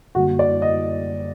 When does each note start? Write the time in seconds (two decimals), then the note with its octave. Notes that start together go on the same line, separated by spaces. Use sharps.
0.15 F#2 D3 G3 A#3 F#4
0.39 D5
0.62 D#5